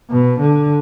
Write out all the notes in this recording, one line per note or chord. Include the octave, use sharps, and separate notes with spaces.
B2
D3